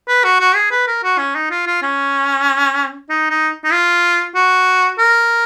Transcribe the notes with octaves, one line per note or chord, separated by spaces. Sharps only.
B4
F#4
F#4
G#4
B4
A#4
F#4
C#4
D#4
F4
F4
C#4
D#4
D#4
D#4
F4
F#4
A#4